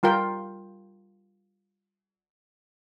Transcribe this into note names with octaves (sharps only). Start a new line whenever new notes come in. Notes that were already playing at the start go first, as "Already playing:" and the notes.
G3 F4 A#4 G5